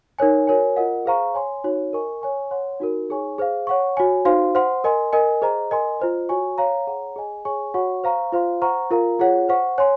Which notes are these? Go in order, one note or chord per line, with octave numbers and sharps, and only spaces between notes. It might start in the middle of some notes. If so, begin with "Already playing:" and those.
D#4 A#4 C#5 G#5
F#4 A#4 C#5 G#5
F4 A#4 D#5 F#5
G#4 C5 F5 A#5 C#6
C#5 G#5 C6
D#4 F#4 C#5
A#4 D#5 G#5 C#6
C#5 G#5 C#6
C#5 F#5 C6
D#4 F#4 A#4
D#4 G#4 C#5 G#5 C#6
G#4 C5 F5
C#5 F#5 C#6
F#4 C#5 G#5
D#4 F#4 C5 F5 C6
C5 F#5 C6
A#4 D#5 G#5 C6
A#4 D#5 G#5
G#4 C5 D#5 A#5
A#4 D#5 G#5 C6
F4 C5 D#5
F#4 C#5 G#5 C#6
C#5 F5 A#5
G#4 C#5 F#5 A#5
G#4 D#5 G#5
G#4 C#5 G#5 C#6
F#4 C#5 F#5 C#6
C5 F5 A#5 C#6
F4 C5 F5 C6
C5 F#5 A#5 C#6
F4 A#4 F5 A#5
F4 G#4 C#5 F#5
C5 F#5 C#6
C#5 G#5 C6